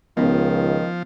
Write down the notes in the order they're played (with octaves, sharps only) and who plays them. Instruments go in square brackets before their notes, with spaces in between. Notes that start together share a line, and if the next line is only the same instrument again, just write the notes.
[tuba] C#2 [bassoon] D#3 [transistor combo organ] F3 [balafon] B3 C#4 D#4